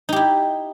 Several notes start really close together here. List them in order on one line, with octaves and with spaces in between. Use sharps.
D#4 G4 E4